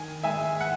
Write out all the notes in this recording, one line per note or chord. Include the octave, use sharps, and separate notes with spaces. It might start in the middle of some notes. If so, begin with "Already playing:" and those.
Already playing: D#3 G#5
G#3 E5 G#5
F#5